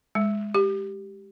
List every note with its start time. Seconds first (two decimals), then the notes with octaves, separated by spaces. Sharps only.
0.15 G#3
0.54 G4